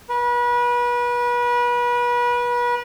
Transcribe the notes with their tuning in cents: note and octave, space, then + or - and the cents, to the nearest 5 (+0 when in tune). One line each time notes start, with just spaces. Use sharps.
B4 -30